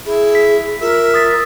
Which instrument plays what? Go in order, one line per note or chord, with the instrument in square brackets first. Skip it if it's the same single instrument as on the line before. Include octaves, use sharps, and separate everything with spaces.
[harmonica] E4 [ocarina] G#4
[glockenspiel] B6
[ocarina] F4 [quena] A#4 [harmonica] E5
[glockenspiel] D#6 A6 B6